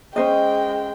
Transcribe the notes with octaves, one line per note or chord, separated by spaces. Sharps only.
G#3 C#4 C5 D#5 G5